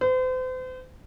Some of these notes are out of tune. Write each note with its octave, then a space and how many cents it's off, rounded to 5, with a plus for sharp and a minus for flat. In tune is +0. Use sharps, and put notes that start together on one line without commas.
C5 -40